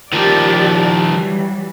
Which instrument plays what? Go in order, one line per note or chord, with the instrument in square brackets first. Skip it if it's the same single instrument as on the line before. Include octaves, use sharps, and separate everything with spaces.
[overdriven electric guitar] D#3 F3 [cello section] G4 D5
[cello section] E3 F#3 G3